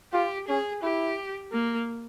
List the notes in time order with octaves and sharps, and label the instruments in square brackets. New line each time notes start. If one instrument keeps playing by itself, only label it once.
[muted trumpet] F4 [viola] G4
[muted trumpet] C#4 [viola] G#4
[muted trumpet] E4 [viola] G4
[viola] A#3